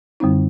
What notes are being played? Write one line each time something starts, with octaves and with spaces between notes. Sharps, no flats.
F#2 D3 G3 C4 D#4